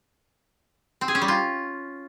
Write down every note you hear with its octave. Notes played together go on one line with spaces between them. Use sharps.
C4
G#4
C#4
G3
F4